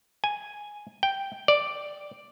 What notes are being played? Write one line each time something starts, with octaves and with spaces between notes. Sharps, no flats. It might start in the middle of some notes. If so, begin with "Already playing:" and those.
G#5
G5
D5